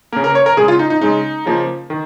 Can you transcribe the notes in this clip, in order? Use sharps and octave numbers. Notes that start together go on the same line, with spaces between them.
C#3 A#3 A#4
A#4
C#5
A#4
C#3 G#3 G#4
F4
D#4
D#4
C#3 G#3 D#4
C#3 F3 A#3
D#3